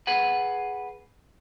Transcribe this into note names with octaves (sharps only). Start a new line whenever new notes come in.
G#4 B4 F#5